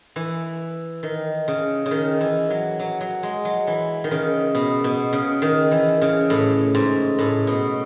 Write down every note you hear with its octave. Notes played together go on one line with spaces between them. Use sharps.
E3
D#3
C#3
C#3
D#3
E3
F#3
F#3
F#3
G#3
F#3
E3
D#3
C#3
B2
B2
C#3
D#3
E3
C#3
A2
G#2
A2
B2